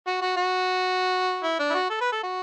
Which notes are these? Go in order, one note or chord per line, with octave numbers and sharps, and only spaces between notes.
F#4
F#4
F#4
E4
D4
E4
F#4
A4
B4
A4
F#4